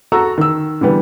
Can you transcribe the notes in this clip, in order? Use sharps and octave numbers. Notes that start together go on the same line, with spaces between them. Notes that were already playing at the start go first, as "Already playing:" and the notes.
F#4 A4 A#5 C#6 E6
D#3 E6
D3 E3 G3 B3